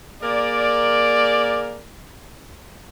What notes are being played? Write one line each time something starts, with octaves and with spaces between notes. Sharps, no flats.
A#3 G#4 A#4 D5